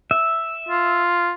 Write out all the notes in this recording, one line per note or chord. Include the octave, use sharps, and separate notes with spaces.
E5
F4